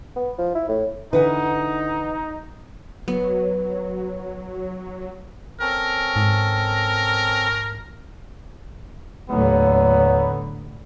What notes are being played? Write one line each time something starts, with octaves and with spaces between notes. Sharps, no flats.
B3
F3
E4
A2
D3 E3 D#4 B4 F#5 G#5
F#3 B3
C4 C#4 A4 A#4
G#2
D#2 A2 D3 F#3 B3